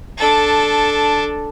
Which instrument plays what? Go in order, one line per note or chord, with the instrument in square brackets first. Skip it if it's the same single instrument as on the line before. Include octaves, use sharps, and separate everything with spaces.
[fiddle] D4 A4